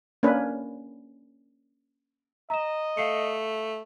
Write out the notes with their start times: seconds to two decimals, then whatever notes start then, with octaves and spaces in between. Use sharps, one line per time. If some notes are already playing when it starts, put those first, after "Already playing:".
0.23 A#3 C#4 D4 B4
2.50 D#5 A#5 E7
2.97 A3 F5 C7 C#7